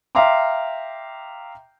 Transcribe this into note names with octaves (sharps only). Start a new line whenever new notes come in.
E5 F5 G5 A#5 C6 D6